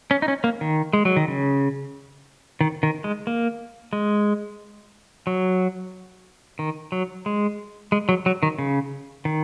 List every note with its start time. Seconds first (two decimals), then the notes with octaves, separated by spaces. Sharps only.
0.11 C#4
0.22 D#4
0.28 C#4
0.44 A#3
0.61 D#3
0.93 G#3
1.05 F#3
1.17 D#3
1.28 C#3
2.61 D#3
2.83 D#3
3.04 G#3
3.27 A#3
3.93 G#3
5.27 F#3
6.59 D#3
6.92 F#3
7.26 G#3
7.92 G#3
8.09 F#3
8.26 F#3
8.43 D#3
8.58 C#3
9.25 D#3